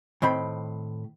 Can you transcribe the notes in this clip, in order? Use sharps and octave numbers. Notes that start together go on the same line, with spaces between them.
A2 D#3 C4 B5